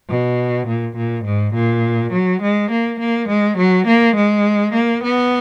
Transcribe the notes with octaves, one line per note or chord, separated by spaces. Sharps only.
B2
A#2
A#2
G#2
A#2
F#3
G#3
A#3
A#3
G#3
F#3
A#3
G#3
A#3
B3